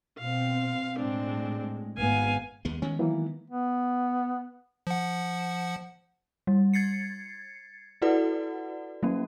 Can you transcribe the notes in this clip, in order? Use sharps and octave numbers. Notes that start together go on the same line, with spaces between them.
B2 C4 F5
A2 G#3 C4 D4
G#1 B3 F5 G#5
D#2 G#3 B3
D#3 G#3 B3 C#4
E3 F#3 A#3
B3
F3 F#5
G3
G#6 A6 C7 C#7
E4 F#4 A4 B4 D5 F#5
F#3 A#3 C#4